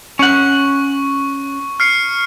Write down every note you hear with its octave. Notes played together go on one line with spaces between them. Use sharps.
C#4 F#5 C#6
F6 C7 C#7